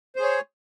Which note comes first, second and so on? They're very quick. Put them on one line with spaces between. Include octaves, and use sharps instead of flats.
C5 G#4 C#5